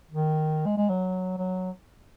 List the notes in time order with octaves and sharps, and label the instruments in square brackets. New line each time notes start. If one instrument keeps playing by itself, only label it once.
[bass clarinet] D#3
G#3
G#3
F#3
F#3